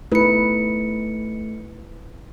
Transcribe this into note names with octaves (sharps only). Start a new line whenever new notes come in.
A3 D#4 E4 B4 C#7